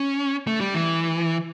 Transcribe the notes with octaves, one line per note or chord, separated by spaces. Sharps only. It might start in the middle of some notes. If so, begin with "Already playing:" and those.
Already playing: C#4
A3
G3
E3